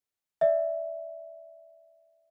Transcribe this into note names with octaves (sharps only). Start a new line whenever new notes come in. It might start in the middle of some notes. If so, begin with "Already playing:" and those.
D5 E5